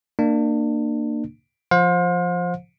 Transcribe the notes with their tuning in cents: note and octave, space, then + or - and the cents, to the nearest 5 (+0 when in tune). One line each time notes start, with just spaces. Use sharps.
A#3 -15 D4 +30
F3 +0 C5 +10 F5 +40